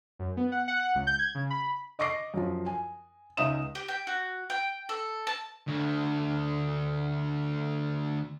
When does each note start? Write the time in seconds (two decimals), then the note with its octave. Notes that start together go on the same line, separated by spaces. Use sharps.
0.19 F#2
0.37 B3
0.52 F#5
0.68 F#5
0.80 F#5
0.95 C#2
1.07 G6
1.19 G#6
1.35 C#3
1.50 B5
1.99 D#5 C#6 D6 A#6 C7
2.34 F#2 F3
2.66 G#5
3.37 C#2 D#4 E5 D#6 E7
3.75 G4
3.88 G5
4.07 F#4
4.50 G5
4.89 A4
5.27 A5
5.68 D2 D3